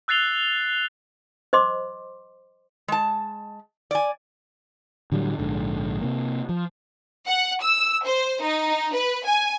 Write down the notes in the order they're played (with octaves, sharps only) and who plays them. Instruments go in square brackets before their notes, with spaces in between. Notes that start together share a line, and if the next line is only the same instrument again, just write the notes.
[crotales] E6 F#6 A6 C7 F7 G7
[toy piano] C5 D#5 C6 D6
[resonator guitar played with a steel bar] G#3 A5
D5 G#5
[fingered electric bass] A2 D3 F#3 G3
A#1 G#2 D3
C3 A#3
F3
[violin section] F#5
E6
C5
D#4
B4
G#5